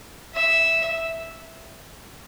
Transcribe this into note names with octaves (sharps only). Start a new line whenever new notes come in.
E5